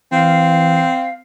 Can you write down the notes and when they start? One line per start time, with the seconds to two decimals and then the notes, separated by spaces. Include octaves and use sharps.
0.12 E3 C4 F5